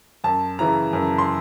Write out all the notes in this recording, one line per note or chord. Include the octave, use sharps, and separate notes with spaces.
F#2 A5
C#3 E3 A#5
F#2
C6